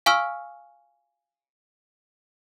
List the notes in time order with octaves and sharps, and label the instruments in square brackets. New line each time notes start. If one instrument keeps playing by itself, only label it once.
[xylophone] F5 G#5 C#6 E6 F6